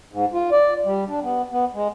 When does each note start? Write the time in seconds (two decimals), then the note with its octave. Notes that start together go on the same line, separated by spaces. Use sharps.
0.12 G#2
0.33 F4
0.52 D5
0.85 G3
1.08 D4
1.22 B3
1.51 B3
1.74 G#3